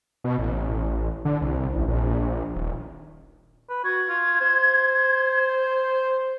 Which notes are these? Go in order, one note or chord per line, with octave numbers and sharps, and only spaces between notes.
B2
A1
D3
C2
A1
A#1
D#1
B4
F#4 G#6
F4
C5